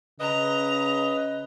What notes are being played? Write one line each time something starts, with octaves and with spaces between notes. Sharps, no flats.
C#3 B4 D#5 A#5